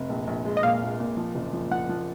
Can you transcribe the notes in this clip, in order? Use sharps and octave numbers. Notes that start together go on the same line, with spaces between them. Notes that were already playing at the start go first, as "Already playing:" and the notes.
Already playing: F1
A#1
A#1
G#3
D#5
A#2 F5
A#1
A#2
F3
F#1
F3
F3 F#5
F3